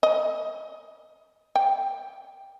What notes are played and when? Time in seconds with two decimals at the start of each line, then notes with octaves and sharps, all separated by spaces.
0.03 D#5
1.56 G5